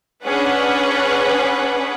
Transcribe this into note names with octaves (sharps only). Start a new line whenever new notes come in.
C#4 D4 G#4 B4 F#5